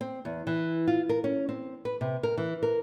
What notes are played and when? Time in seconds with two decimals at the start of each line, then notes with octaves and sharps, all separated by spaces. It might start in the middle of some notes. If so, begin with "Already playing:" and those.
0.01 C4
0.25 E2
0.47 E3
0.88 F4
1.09 A#4
1.24 C#4
1.49 C4
1.85 B4
2.01 C3
2.23 A#4
2.38 E3
2.63 A#4